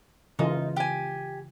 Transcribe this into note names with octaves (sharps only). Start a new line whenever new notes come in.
C#3 E3 D#4 F4
G4 G#5